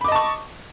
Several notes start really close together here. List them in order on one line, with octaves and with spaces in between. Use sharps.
B5 D6 D#5 A5 C#6